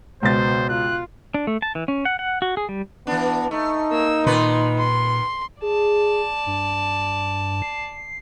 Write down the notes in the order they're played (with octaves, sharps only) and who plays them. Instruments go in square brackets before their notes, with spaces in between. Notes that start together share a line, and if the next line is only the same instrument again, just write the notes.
[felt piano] C#2 A6 [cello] B2 [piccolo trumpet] C5
[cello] F4 [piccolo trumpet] F#6
[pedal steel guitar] D4
A3
A5
E3
C#4
F#5
F#5
F#4
G#4
G3
[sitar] E3 D4 [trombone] B3
[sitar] A3 [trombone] D#4
[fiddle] A#3 E6
[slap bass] A#2 [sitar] D#3 B4 [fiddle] C6
[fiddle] C6
[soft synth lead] G#4 [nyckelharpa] D5 A5
[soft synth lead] G2
C7